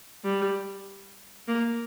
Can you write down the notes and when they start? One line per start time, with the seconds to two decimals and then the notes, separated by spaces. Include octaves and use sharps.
0.24 G3
1.48 A#3